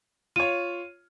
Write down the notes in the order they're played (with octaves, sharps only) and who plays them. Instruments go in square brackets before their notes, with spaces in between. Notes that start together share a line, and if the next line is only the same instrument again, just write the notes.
[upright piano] F4 C#5 [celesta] D#7